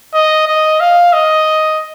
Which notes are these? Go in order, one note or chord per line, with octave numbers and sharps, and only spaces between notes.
D#5
D#5
F5
D#5